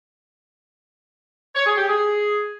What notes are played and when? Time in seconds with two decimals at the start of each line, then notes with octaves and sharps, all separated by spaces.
1.55 C#5
1.66 G#4
1.77 G4
1.88 G#4